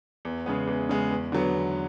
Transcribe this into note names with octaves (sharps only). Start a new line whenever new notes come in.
E2
C#3 G#3 B3
E2
C#3 G#3 B3
E2
D3 F#3 B3
E2